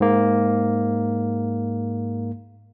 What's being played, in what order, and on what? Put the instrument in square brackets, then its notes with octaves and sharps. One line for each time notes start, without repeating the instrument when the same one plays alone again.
[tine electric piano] G#2 A#3